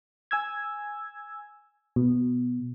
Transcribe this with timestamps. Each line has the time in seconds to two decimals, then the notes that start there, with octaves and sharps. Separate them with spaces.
0.31 G#5 E6 G#6
1.96 B2